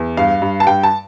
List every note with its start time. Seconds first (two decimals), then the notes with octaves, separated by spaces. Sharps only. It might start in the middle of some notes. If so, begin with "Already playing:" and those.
Already playing: E2
0.17 G2 F5
0.42 G2
0.60 A5
0.67 G2 G5
0.83 A5